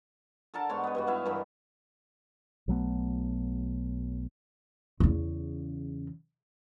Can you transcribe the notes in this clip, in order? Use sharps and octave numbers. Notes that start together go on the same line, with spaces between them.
D3 A4 A#4 A5
G#2 B3 C#5 C6
B3 B4
G2 G3 F#4
B3 E4 E5 F5
G2 D#3 E3 B5
B1 F#3 A3 B3
E2 C#3